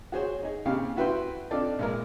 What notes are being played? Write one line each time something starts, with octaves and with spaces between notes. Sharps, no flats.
F#4 G#4 C5 C#5
D#4 G#4
D#2 C#3 C4 G4 F5
E4 F#4 B4 E5 G5 C6
C4 D4 D#4 F4 A4 D5
A#1 G#3 A#4